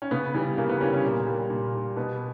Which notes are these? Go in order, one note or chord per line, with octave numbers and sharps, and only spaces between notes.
C#4
C#3 B3
E3 G3
C#3 A#3
B3
E3 G3 C#4
C#4
A#2 A#3
G3
A#2
G3
B2 B3